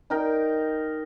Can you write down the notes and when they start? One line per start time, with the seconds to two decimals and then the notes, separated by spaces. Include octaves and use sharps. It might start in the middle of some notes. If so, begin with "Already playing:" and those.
0.10 D#4 A#4 G5